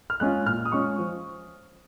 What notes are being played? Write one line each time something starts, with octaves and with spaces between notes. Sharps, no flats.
F6
G#3 C#4 F4 F#6
A#2 F6
D#6
G#3 C#4 F4 C#6
F3